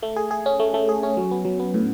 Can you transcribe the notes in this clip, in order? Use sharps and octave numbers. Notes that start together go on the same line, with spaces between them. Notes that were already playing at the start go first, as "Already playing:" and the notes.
A3
G#4
G#4
C#4
A3
A3
G#4
C#4
F#3
B3
F#3
B3
A2